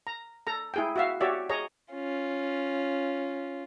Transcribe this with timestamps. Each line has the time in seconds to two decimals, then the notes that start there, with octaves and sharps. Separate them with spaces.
0.07 A#5
0.47 A4 A#5
0.74 E4 G#4 G5
0.96 F#4 E5 F5
1.21 F#4 G4 C#5 D5 E5
1.49 G#4 C#5 D#5 A#5
1.93 C#4 F4